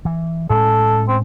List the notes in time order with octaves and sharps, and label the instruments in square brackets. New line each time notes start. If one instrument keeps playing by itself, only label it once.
[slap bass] E3
[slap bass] A2 G#3 C#4 [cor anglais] A4
[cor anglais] C4